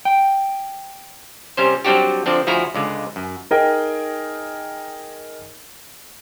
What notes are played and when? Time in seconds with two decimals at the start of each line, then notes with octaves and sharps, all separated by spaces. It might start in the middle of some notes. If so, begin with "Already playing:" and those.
0.05 G5
1.57 C3 G3 C#4 C5
1.85 F#3 G3 C4 D4 F#4 G4
2.26 D3 F3 C4 D4
2.47 D2 F3 E4 F#4 G#4 A#5
2.74 C#2 D3 G#3
3.16 F#2
3.51 D#4 G#4 A#4 D#5 G5